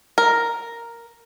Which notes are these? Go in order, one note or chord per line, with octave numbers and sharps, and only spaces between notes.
A#4